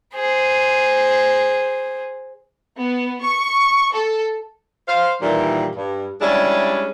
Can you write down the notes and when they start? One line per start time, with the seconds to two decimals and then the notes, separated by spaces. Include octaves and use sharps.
0.15 G#4 C5
2.79 B3
3.24 C#6
3.94 A4
4.88 C5 F5
5.22 A#2 D#3 E3 G3
5.76 G2
6.21 G3 G#3 C#4 D4 E4